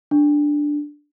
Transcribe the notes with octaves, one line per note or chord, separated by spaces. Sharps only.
D4